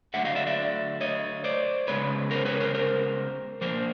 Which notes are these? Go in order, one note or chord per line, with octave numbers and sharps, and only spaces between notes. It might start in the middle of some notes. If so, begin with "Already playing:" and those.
D3 F#3 A3 E5 F#5
D#5 F5
D5 E5
D5 E5
C#5 D#5
C5 D5
C#3 F3 G#3 B3 B4 C#5
A#4 C5
B4 C#5
A#4 C5
A#4 C5
F3 A#3 D4 A#4 C5